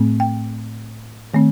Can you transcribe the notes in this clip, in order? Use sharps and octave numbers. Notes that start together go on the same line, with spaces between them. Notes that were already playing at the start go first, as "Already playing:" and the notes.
Already playing: A2 A3 C4
G5
D#3 A3 C4